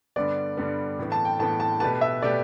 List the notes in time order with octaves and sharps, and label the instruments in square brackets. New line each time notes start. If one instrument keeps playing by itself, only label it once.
[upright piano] G2 D3 G3 B3 [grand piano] D5
[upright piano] G2 D3 G3 B3
A2 E3 B3
[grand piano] A5
G5
[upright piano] A2 E3 B3 [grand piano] A5
[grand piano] A5
[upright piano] B2 A3 G4 B4 [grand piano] A5
[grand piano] E5
[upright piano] B2 A3 G4 B4 [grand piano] D5